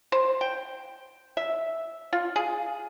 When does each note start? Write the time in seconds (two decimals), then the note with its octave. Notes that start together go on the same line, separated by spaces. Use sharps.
0.12 C5
0.41 G5
1.37 E5
2.13 F4
2.36 G#4